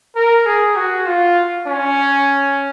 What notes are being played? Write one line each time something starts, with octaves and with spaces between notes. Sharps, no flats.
A#4
G#4
F#4
F4
C#4